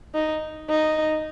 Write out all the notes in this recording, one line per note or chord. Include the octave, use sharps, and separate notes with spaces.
D#4
D#4